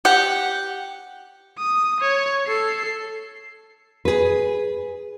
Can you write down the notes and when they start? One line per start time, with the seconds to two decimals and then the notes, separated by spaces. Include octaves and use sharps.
0.05 G4 F#5
1.58 D#6
2.00 C#5
2.47 A4 C7
4.05 G#4 B4